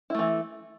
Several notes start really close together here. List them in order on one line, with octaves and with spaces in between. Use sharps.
E4 A3 E3